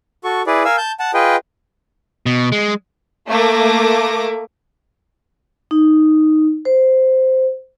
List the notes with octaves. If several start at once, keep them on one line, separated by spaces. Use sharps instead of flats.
F#4 A4 C#6
E4 G#4 B4 D5
A#4 F5 G#5 E6
A5 G6
F#5 A5
F4 G#4 B4 D#5 G5
B2
G#3
A3 A#3 D6 A#6
D#4
C5